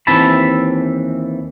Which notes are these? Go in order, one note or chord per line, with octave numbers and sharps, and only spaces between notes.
D#2 E3 C4 E5 A5 B5